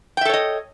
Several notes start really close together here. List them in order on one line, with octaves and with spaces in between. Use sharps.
G5 E5 A4 C#5 D#5